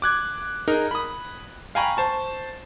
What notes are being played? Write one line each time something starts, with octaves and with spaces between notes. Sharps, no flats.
D6 F#6 G#6
D#4 G#4 A#4
B5 D#6
F5 G5 G#5 A#5 B5 C#6
C5 A5 C#6